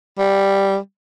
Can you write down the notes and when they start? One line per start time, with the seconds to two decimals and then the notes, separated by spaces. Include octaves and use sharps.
0.19 G3